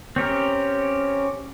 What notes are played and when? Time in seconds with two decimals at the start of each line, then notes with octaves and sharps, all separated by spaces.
0.16 C4 C#4 G4 A#4